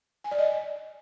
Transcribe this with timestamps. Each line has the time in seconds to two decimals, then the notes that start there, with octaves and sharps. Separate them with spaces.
0.24 G#5
0.31 D5
0.39 D#5